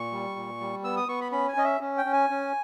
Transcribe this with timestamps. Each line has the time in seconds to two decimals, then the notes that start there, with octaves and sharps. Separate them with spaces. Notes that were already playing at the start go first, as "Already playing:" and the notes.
Already playing: A#2 C#6
0.12 G3
0.36 A#2
0.61 G3
0.84 B3 E6
0.97 D#6
1.08 B3 C#6
1.21 B5
1.32 C#4 B5
1.49 G#5
1.57 C#4 D#5
1.65 E5
1.81 C#4
1.98 G5
2.05 C#4
2.13 G#5
2.30 C#4